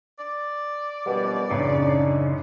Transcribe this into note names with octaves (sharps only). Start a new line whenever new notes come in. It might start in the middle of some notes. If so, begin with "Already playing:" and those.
D5
A#1 F#2 B2 G3 B3
A1 F#2 C#3 D4 D#4